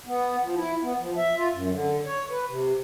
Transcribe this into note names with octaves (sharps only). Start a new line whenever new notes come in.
B3
F3
E4
B3
F3
E5
F4
F#2
D3
C#5
B4
C3